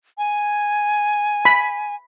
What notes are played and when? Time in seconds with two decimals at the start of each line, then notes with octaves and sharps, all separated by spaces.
0.18 G#5
1.45 B5